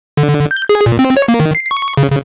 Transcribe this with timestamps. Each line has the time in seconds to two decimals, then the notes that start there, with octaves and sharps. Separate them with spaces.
0.17 D3
0.51 G6
0.69 G#4
0.86 A#2
0.99 C4
1.17 C#5
1.28 A#3
1.40 D#3
1.55 C7
1.71 C#6
1.97 C#3
2.11 C#3